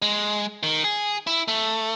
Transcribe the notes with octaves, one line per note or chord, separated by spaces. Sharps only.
G#3
D#3
G#4
E4
A3